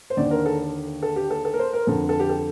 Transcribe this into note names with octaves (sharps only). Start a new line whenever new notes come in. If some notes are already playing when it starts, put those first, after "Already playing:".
C5
D#2 D3 D5
A#4
A4
A4
G4
A4
A4
A#4
C5
A#4
F2 D3 A4
A4
G4
A4